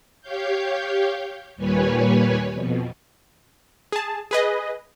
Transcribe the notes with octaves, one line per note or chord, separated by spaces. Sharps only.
G4 C#5 F5 G6
D#2 A#2 G3 B4 C#5 G#5
F2 B2
G#4 A5
G#4 B4 D#5